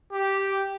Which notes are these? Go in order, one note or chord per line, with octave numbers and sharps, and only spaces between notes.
G4